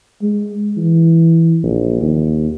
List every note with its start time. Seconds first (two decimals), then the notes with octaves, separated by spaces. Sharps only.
0.22 G#3
0.77 E3
1.63 A#1
2.01 D#2